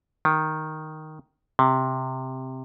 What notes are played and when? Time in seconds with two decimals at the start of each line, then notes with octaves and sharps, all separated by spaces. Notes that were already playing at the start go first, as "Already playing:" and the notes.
0.25 D#3
1.59 C3